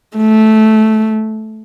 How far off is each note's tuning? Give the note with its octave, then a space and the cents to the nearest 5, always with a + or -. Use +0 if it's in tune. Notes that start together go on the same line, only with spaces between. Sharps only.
A3 -10